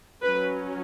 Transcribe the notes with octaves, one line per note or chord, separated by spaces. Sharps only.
F#3 C#4 B4